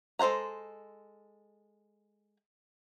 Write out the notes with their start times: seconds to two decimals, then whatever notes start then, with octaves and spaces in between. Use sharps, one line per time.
0.19 G#3 A4 C5 F#5 A#5